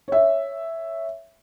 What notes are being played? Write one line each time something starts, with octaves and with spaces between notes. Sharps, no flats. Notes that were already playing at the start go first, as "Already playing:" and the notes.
C#5 E5